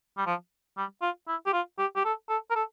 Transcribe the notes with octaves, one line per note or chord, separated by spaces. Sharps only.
G3
F3
G3
F4
E4
G4
F4
G4
G4
A4
A4
A#4
A4